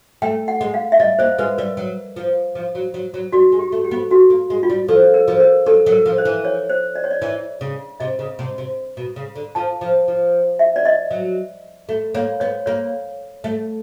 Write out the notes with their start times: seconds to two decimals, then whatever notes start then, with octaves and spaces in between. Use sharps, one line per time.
0.22 A3 G5
0.48 F#5
0.61 G#3
0.74 F5
0.92 E5
1.00 G3 D#5
1.19 A#3 C5
1.38 G#3 B4
1.58 G3 A#4
1.77 F#3
2.16 F3
2.55 F3
2.75 F#3
2.94 F#3
3.14 F#3
3.32 G3 F#4
3.52 G#3
3.59 G4
3.72 A3
3.84 G4
3.91 B3
4.11 A#3 F#4
4.30 A#3
4.50 G#3
4.63 F4
4.70 G3
4.88 F3 A4
5.14 A#4
5.28 F3
5.40 A#4
5.66 F#3 A4
5.86 F#3
5.92 A#4
6.06 F3
6.18 C5
6.25 E3
6.45 C#5
6.70 C5
6.95 D5
7.04 C#5
7.11 D5
7.22 E3 D5
7.61 C#3
8.00 C3 D#5
8.19 C#3
8.39 C3
8.58 C3
8.97 B2
9.16 C#3
9.36 D3
9.55 F3 A5
9.81 F3
10.08 F3
10.59 E5
10.76 D5
10.86 D#5
11.11 F#3
11.89 A3
12.14 A#3 C#5
12.40 B3 C#5
12.66 A#3 C#5
13.44 A3